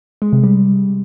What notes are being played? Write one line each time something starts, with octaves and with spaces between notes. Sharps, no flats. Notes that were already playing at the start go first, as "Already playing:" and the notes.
G#3
C3
G3